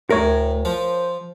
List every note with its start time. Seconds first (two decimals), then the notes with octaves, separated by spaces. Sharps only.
0.11 D2 A2 A#4 C#5
0.65 F3 C5